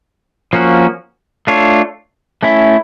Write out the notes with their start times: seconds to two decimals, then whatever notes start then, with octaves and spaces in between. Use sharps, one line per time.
0.53 F3 A#3 C#4 F#4
1.47 A3 D4 F4 A4 C#5
2.43 A3 C#4 E4